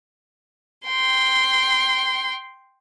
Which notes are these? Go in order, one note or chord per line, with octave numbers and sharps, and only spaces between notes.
G5 C6